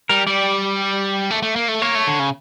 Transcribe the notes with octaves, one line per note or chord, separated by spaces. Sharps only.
G3 A#4
G3 D5
A3
A3
A#3
A3
A#3 C#5
A3
D3
C#3